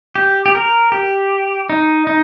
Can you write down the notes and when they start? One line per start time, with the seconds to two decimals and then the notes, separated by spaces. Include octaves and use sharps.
0.15 G4
0.46 G4
0.55 A#4
0.92 G4
1.70 D#4
2.07 D#4